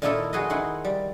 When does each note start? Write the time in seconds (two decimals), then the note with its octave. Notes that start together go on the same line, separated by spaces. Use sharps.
0.02 A#2 D#3 A#3 D#4 E4 A4
0.33 G#3 F#4 G#4 B4 D#5
0.50 D#3 E4 F#5 C6
0.85 G3